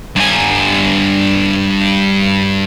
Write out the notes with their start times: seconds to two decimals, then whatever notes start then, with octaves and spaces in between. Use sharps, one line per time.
0.16 G2 G#5